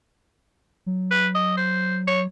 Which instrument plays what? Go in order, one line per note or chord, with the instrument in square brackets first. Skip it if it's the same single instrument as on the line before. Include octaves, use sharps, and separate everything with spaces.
[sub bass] F#3
[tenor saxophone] B4
D#5
C5
C#5